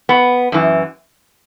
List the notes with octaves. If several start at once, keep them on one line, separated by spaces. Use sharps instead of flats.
B3
F#2 E3